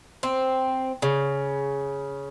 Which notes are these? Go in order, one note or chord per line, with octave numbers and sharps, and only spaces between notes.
C4
C#3